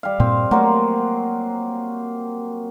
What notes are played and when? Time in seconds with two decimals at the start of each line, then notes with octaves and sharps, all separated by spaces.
0.03 G3 F5
0.20 G2 A#2 C4
0.51 F#3 A3 A#3 C5